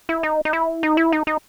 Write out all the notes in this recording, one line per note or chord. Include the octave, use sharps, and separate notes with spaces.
E4
D#4
D#4
E4
D#4
E4
D#4
D#4